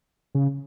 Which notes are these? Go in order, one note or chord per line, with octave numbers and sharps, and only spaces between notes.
C#3